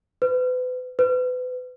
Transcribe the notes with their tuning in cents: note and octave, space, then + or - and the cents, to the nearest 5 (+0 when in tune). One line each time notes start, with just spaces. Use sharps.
B4 +35
B4 +30